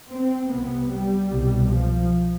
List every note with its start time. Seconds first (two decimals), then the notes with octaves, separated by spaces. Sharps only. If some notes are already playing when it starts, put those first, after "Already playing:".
0.10 C4
0.50 C2 C3 B3
0.89 G3
1.28 C2 B2
1.68 F3